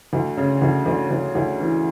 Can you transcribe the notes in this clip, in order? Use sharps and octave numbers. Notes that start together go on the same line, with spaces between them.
D2
C#3
D2
D2
D2
D2
E3